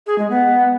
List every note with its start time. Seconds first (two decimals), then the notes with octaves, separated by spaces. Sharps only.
0.07 G#4
0.18 G#3
0.30 B3